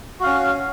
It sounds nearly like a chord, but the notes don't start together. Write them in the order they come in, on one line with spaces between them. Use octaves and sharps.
F#4 F5 C#4